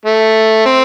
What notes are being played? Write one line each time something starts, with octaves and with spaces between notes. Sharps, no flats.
A3
C4